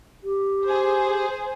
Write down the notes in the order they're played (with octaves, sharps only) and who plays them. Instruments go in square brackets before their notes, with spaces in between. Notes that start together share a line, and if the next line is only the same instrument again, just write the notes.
[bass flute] G4
[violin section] G#4 C5